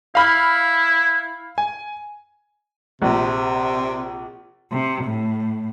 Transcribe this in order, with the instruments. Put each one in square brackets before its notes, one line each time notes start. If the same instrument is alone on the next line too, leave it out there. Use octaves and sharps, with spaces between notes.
[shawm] E4 [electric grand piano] F5 B5 F6
[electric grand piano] G#5
[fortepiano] A#1 [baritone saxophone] C3
[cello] C3
A2